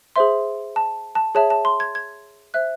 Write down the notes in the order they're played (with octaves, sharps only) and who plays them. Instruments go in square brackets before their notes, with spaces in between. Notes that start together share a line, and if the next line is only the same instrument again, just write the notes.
[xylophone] G#4 C5 E5 C6
A5
A5
G#4 C#5 E5 A5
A5
C6
G#6
G#6
C5 E5 F#6